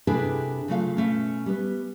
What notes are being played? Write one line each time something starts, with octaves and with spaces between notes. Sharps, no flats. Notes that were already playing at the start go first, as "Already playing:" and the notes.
C3 D4 E4 G#4 A4 B4
C#3 F#3 A3 C#4 F4 F5
B2 A3 C#4
G3 B3